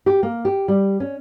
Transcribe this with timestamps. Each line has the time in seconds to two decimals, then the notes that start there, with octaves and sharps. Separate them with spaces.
0.06 G4
0.23 A#3
0.45 G4
0.68 G3
1.00 C#4